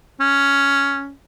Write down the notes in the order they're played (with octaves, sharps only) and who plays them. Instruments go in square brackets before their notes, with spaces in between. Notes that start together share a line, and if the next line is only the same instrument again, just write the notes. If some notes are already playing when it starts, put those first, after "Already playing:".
[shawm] C#4